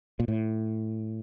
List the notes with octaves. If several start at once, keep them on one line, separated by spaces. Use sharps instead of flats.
A#2
A2